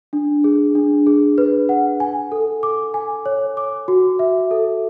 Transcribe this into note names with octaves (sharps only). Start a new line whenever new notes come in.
D4
G#4
D4
G#4
B4
F#5
G#5
A4
D6
G#5
C#5
D6
F#4
E5
A4